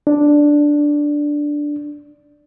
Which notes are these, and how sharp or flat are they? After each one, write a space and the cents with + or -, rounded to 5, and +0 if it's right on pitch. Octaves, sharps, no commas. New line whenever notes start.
D4 +0